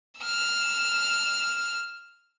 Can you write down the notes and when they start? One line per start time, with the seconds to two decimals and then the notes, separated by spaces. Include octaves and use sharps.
0.20 E6 F6